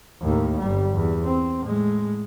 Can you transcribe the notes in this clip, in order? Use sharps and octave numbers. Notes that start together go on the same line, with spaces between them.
D#2 A2
G1 G3
E2
C4
A2 G#3